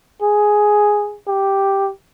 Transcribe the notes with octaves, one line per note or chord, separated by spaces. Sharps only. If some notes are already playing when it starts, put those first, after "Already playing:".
G#4
G4